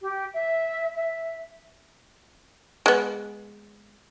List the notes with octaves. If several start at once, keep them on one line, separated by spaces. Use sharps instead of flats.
G4
E5
E5
G#3 B3